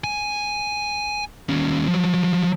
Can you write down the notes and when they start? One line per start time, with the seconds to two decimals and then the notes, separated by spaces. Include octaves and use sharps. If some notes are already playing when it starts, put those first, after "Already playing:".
0.04 G#5
1.49 D#2 C#4
1.89 F3 F#3